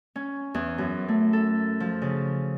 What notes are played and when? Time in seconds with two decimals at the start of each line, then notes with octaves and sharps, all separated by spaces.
0.16 C#4
0.54 E2
0.78 F#2
1.08 A3
1.33 A4
1.80 F3
2.02 C#3